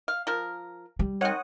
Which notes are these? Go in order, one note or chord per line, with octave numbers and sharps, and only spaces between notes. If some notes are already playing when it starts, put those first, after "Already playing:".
F5
F3 A#4
G3
D#3 C4 C#5 F#5 D#6